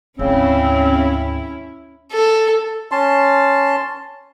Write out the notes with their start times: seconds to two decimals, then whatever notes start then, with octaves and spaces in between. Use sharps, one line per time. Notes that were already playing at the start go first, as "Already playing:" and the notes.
0.19 D2 G#2 C#3 C4 C#4 E4
2.12 A4
2.92 C#4 A5 C6